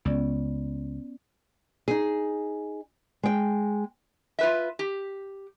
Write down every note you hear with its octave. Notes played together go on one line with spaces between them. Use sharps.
C#2 B3 C#4 D5
D#4 G#4
G#3 G5
F4 B4 E5
G4